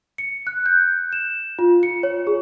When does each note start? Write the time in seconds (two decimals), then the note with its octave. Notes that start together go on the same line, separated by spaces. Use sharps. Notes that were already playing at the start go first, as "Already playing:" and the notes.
0.18 C#7
0.47 F#6
0.66 G6
1.12 E7
1.59 F4
1.83 C#7
2.03 C#5
2.27 G#4